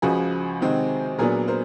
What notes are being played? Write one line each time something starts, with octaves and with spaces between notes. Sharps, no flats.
C#2 C#3 F3 F#4 G#4
C3 D#3 G#3 C4
A#2 F#3 B3 D4 G#4 A#4
A#4 C5